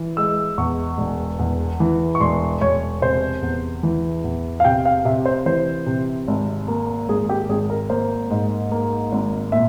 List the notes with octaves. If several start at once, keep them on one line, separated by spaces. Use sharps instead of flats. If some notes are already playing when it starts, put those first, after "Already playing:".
Already playing: E3
G#3 E6
E2 C#6
E1
E2
E3
C#6
E1 C6
E1 C#5
C3 C5
E2
E3
E2
F5
C3 G5
F5
C3 E5
C5
E3 C5
C3
G#1
A#3
G#1 G#4
G4
G#1 G#4
A#4
A#3 C5
G#2
A#3
G#1
A#2 E5